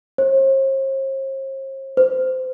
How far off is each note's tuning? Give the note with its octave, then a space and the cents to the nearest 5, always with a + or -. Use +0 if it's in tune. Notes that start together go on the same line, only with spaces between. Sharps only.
C5 +45
C5 -20